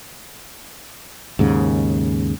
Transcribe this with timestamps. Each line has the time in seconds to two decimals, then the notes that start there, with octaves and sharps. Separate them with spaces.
1.39 D#2 G#2 C#3